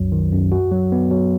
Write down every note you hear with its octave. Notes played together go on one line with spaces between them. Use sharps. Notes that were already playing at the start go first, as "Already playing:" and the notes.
Already playing: C2 F#2 F#3
D#3
F#2
F#4
F#3
B3
F#3